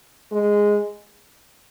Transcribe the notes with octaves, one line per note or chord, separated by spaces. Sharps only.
G#3